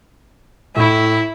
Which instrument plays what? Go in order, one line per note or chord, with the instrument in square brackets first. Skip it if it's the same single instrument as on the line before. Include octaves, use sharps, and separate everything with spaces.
[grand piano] A2 [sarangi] E4